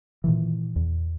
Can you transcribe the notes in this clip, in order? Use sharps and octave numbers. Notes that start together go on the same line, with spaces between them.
A#2 D#3 E3
E2